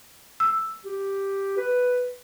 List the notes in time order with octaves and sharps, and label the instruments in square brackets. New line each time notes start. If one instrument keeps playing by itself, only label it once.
[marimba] E6
[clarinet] G4
B4